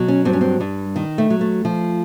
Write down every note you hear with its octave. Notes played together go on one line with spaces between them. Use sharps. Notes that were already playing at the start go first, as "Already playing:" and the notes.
Already playing: B2 F#3
C#4
G2 C4
C#4
C4
G2 G3
D#3
A3
F#3
A3
F3